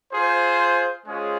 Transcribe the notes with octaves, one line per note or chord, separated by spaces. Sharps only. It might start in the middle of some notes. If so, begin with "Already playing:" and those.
F4 G#4 C5
G#3 C#4 F4 G#4 C5